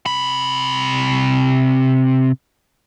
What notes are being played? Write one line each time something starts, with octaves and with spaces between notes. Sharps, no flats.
C3 B5